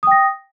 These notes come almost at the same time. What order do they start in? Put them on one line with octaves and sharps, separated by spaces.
D#6 G5 A#6